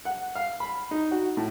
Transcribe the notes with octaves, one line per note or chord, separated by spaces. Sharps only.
F#5
F5
B5
D#4
F#4
A2